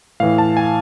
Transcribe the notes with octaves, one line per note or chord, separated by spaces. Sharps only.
A2 E3 F5
A5
G#5